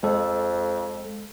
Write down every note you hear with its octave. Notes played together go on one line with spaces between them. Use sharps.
F2 G#3 A4